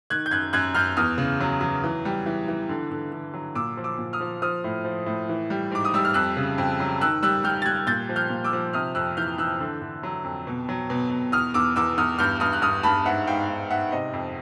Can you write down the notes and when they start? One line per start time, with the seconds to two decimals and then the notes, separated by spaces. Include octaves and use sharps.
0.10 D#3 F#6 G#6
0.26 G6
0.31 F#2 F#6 G#6
0.53 F#2 F#6 G#6
0.75 F#2 F6 G6
0.97 E2 D#6 F6
1.18 C#3
1.40 F#3
1.61 F#3
1.84 E3
2.05 G3
2.26 E3
2.48 E3
2.69 D3
2.92 D3
3.12 D3
3.34 F#3
3.55 A#2 D6 E6
3.77 F3
3.84 D6 E6
3.98 A#2
4.13 D#6 F6
4.21 F3
4.42 F3 D#6 F6
4.64 A2
4.85 F3
5.06 A2
5.29 E3
5.50 G3
5.71 G#2 D6
5.85 D#6
5.94 G3 E6
6.05 F6
6.14 F2 E6 F#6
6.37 C#3
6.58 F2
6.80 F#3
7.01 D#3 E6 F#6
7.23 G3 E6 F#6
7.44 G3 F6 G6
7.62 A6
7.66 G3 F#6 G#6
7.87 A#2 G6 A6
8.09 F3
8.16 F6 G6
8.30 A#2
8.44 D6 E6
8.53 F3
8.73 C3 D#6 F6
8.95 F2 E6 F#6
9.17 E3 F6 G6
9.38 E3 E6 F#6
9.60 D3
9.82 D3
10.03 F#3
10.24 F2
10.47 B2
10.69 F#3
10.90 B2
11.11 B2
11.32 E2 D#6 F6
11.54 E2 D6 E6
11.76 E2 D6 E6
11.98 E2 D#6 F6
12.19 G2 F6 G6
12.40 G2 D#6 F6
12.53 F#6
12.62 G2 D#6 F6
12.83 G2 A5 B5
13.05 G#2 E5 F#5
13.27 G#2 F5 G5
13.48 G#2
13.70 G#2 E5 F#5
13.92 C3 D#5
14.13 F2